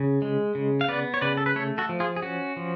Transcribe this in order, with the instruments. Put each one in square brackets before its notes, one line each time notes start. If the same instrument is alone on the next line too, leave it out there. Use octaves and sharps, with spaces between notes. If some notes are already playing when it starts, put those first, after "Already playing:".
Already playing: [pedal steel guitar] C#3
G#3
C#3
F5
B3 B4 D5
C#5
C#3 B4 D5
A4
B4
A3 A4 C#5
F#4 A4
F3
F4 G#4
G#4
C#4 F#4
F3